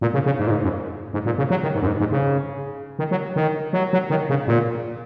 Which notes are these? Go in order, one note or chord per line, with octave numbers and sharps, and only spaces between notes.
A#2
C#3
C#3
G#2
A#2
G#2
F#2
G#2
A#2
C#3
F#3
D#3
G#2
F#2
G#2
G#2
C#3
D#3
F#3
D#3
F#3
F#3
D#3
C#3
A#2